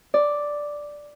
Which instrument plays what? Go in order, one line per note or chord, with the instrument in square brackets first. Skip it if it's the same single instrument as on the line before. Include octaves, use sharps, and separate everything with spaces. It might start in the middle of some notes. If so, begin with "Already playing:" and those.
[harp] D5